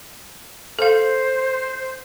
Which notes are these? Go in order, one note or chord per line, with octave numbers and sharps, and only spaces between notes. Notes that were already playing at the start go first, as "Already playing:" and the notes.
A4 C5 F5